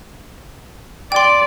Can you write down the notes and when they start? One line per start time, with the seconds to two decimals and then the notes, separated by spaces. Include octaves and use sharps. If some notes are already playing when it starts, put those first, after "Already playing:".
1.12 D5 G5 C6